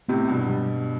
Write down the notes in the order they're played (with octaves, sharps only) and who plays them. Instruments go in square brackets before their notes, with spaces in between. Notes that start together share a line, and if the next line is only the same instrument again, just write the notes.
[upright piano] A2 C3 [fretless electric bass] B3
[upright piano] G2 B2
[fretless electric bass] G3